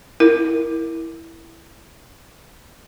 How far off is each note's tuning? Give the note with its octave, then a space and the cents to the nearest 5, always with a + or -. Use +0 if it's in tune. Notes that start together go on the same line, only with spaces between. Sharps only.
E4 +0 A#4 +0